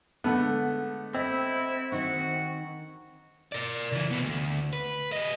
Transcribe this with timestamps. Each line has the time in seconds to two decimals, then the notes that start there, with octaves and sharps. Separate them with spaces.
0.24 D3 G#3 A3 B3 A4
1.15 C4 E4 D#5
1.92 D#3 D#4 F#4
3.52 A#4 D5
3.92 C#3 E3
4.11 C3 B3
4.22 D2
4.73 B4
5.12 G3 D#5